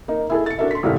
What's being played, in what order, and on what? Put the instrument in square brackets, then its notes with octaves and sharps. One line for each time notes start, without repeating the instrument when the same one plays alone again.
[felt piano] A#3 D#4
E4 G#4 A4
A6 C#7
D4 F#4 A4 A#4 E5
C6 B6
G#1 F#2 C3 E3 A3 F6